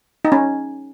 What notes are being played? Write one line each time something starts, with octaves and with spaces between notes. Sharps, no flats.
D#4
C#4